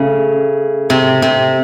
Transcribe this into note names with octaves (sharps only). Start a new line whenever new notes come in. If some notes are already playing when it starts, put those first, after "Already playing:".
Already playing: C#3 A3
C3
C3